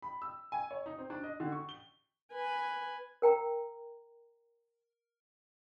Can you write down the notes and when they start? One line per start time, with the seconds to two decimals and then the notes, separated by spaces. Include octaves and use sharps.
0.02 B5
0.22 E6
0.52 G#5
0.71 C#5
0.86 D#4
0.98 C4
1.10 D4
1.23 D#5
1.40 D3
1.52 C#6
1.69 G7
2.33 B4 G#5
3.22 A#4 G5 A#5